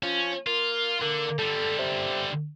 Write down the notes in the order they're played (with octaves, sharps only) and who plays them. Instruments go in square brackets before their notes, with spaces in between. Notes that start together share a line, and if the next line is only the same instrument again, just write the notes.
[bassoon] F3 [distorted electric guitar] C#4
[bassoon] A#3 [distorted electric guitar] F4
[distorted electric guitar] D3 [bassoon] A#3
[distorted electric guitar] D3 G3 [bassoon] A4
[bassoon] C3